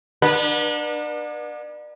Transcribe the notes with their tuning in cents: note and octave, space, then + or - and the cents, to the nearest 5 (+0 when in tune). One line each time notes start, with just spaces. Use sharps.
B3 -40 D4 +35 B4 -25